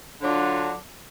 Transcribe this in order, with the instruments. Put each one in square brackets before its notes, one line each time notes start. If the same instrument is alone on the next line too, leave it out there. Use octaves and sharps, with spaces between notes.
[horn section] D3 F#3 D4 F4